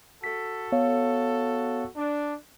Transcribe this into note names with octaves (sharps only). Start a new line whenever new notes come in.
F#4 A4 B6
B3 C#5 F5
D4